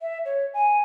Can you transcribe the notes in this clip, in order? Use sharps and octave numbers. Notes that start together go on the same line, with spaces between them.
E5
C#5
G#5